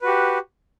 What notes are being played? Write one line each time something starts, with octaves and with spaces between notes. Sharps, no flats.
F#4 G4 B4